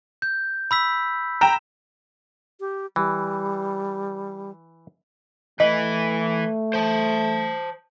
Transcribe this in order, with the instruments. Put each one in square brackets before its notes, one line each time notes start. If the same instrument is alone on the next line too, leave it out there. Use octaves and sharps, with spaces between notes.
[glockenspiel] G6
B5 E6 B6
[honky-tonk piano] G5 A#5 E7
[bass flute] G4
[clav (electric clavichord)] E3 [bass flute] G3
[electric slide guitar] E3 B4 [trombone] A3 [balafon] D#5
[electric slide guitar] C5 A5